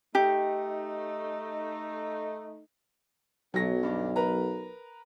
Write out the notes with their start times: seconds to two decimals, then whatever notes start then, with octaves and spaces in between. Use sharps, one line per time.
0.15 A3 D#4 G4
3.54 B1 F#3 A#6
3.83 G2 D4
4.16 A#4 B4 A#5